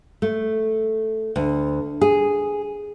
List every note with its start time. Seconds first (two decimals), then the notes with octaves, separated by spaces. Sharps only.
0.22 A3
1.36 D2
2.01 G#4